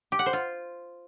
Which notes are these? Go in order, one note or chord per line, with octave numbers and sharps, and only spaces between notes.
G4
F#5
C5
F4